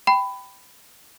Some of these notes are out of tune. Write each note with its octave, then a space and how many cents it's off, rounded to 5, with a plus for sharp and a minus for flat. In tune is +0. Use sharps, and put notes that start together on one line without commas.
G5 -5 B5 +15